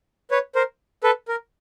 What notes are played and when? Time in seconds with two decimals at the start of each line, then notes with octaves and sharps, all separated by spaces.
0.31 B4 C#5
0.55 A#4 C5
1.04 A4 B4
1.28 A#4